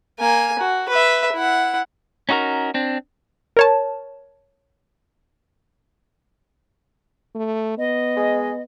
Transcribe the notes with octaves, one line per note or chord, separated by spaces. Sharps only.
A#3 G#5
F#4
B4 E5
E4 F#5
C#4 D#4 F#4 G#4 A#4
C4 D4
A#4 C#5 A5
A3
B3 D#5
G#3